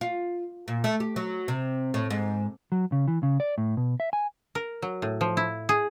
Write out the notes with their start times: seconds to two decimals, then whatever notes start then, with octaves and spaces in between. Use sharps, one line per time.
0.01 F4
0.68 A#2
0.84 A3
1.00 G4
1.16 F#3
1.48 C3
1.94 A2
2.10 G#2
2.72 F#3
2.92 C#3
3.08 E3
3.23 C#3
3.40 D5
3.58 A2
3.77 B2
4.00 E5
4.13 G#5
4.55 A#4
4.82 F#3
5.02 A2
5.21 F3
5.37 E4
5.69 G#4